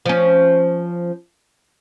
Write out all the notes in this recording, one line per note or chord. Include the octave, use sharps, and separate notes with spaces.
F3 C#4